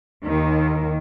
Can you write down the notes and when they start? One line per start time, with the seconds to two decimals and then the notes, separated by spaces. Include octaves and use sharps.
0.24 D#2 D#3